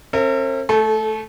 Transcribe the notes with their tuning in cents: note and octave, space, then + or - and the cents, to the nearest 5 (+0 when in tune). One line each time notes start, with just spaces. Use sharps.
C4 +45 A#4 -40 E5 +0
A3 -5 A4 -30